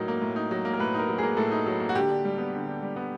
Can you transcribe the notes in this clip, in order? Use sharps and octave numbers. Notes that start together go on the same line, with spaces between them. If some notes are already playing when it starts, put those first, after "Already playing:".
Already playing: A2 F#3 D#4 A#4
A#3
A2
D#4
F#3
A#3
A#4
A2 B4
D#4 A#4
F#3
A#3 G#4
A2 A4
D#4
F#3
A#3
F#4
D3 G4
D4
G3
B3
D3
D4
G3
B3